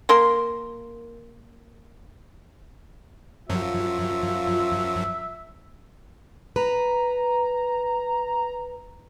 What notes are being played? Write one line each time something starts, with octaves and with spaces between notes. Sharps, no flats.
A#3 A#4 C6
F#2 F3 F#3 F4 E5
B4 A#5